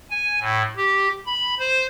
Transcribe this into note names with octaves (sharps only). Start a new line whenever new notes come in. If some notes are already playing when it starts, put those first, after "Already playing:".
G#5
A2
G4
B5
C5